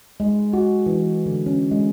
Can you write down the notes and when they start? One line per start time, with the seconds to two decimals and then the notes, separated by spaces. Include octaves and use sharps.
0.20 G#3
0.53 F#4
0.86 E3
1.26 D3
1.46 C#4
1.71 G#3